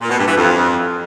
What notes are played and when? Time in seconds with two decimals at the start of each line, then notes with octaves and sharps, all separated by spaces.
0.01 A#2
0.10 B2
0.18 G2
0.27 E3
0.35 F2